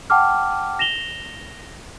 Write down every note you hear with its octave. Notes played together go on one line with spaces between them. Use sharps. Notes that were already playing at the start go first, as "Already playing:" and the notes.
F#5 G5 A5 D6 F6
A#6 E7 F7 G7